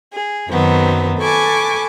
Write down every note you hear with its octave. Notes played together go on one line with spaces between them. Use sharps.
G#4
F#2 D#3 F#3 B3 C4
A4 B4 G#5 C#6 D6